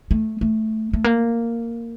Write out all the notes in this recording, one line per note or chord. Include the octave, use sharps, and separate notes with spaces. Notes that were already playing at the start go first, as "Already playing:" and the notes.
A3
A3
A3
A#3